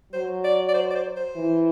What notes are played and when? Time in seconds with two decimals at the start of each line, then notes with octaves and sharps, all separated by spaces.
0.13 F#3 C5
0.44 D5
0.69 D5
0.74 C5
0.91 D5
0.95 C5
1.17 C5
1.36 E3